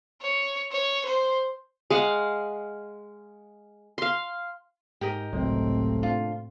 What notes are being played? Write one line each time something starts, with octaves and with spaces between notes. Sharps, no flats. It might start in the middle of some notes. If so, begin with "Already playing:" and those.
C#5
C#5
C5
G#3 F5 F#5
F5 C6
G#2 G4 A#4 D#5
G1 C#2 A2 C3 F#3 A3 A#3 C4
D4 F4